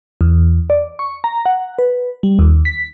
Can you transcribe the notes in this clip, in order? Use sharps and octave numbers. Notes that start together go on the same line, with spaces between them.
E2
D5
C#6
A#5
F#5
B4
G3
D#2
B6